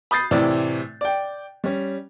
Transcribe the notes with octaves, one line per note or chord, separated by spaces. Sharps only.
B5 D#6 G6 A6 C7
A2 C3 E3 D5
D5 G5
G3 C#4